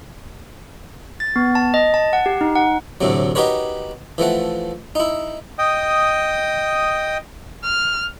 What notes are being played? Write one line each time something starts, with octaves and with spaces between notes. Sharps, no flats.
A6
B3
A5
D#5
A5
F#5
G4
D#4
F#5
D2 A2 C3 F#3
D#4 F#4 G4 A#4 B4 C#5
E3 F3 A3 F#5
D#4 E4
D#5 G5 D#6
F6